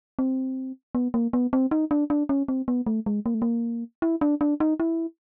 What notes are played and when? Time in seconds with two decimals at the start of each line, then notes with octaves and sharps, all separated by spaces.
0.19 C4
0.95 B3
1.14 A#3
1.33 B3
1.53 C4
1.71 D#4
1.91 D4
2.10 D4
2.29 C#4
2.48 C4
2.68 B3
2.86 A3
3.06 G#3
3.26 A#3
3.34 A3
3.42 A#3
4.02 E4
4.21 D4
4.41 D4
4.60 D#4
4.80 E4